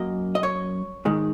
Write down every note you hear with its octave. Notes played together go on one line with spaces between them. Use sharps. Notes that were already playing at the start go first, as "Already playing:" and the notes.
Already playing: F#2 A#3 D#5
D#5
C#5
G#2 D#3 G#3